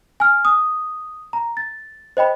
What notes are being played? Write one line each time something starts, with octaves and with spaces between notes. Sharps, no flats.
G#5 F6
D#6
A#5
A6
C5 D#5 G5 B5